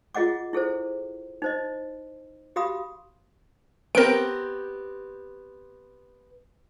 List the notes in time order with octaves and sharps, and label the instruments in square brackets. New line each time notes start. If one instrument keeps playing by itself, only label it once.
[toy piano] F4 G#4 D#5 F#5 D6
E4 G#4 A4 C5
D#4 C5 D#5
F#4 G4 F5 B5 D#6
[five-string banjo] B3 C4 G4 [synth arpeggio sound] A#4 D7